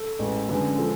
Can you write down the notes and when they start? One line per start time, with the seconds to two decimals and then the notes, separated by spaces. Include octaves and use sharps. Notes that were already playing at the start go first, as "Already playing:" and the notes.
Already playing: A4
0.19 A1 A2 G#3
0.48 F#2 D3 G#3 B4
0.78 F3 G#3 A4